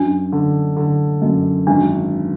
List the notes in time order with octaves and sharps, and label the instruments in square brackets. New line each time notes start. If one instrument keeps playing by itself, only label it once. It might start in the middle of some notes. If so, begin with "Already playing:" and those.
Already playing: [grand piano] F#2 [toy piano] D4
[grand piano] D3
D3
F#2
[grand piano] G#1 [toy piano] D4